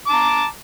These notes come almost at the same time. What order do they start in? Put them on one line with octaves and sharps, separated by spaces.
D6 A5 A#5